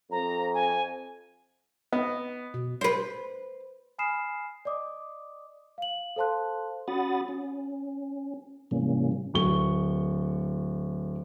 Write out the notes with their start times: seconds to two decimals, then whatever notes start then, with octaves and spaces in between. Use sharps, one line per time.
0.11 F2 A#5
0.54 G#5
1.93 B3 D#5
2.54 B2
2.81 B4 C5
3.98 G#5 B5 D#6 F6 C7 E7
4.65 D5 D#5 D6 D#6
5.78 F5 F#7
6.16 A4 C5 F5 A5 C6 F#6
6.88 C#4 F#4 F#5 B5 D#6 A6
7.28 C#4
8.71 G#2 C3 E3 G3 A#3 C#4
9.34 D1 A3 C#6 G7